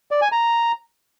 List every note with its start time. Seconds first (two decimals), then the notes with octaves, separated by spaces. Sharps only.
0.11 D5
0.22 G#5
0.32 A#5